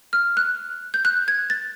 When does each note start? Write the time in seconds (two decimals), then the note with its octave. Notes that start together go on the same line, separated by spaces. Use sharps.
0.13 F6
0.37 F#6
0.94 G6
1.05 F#6
1.28 G#6
1.50 A6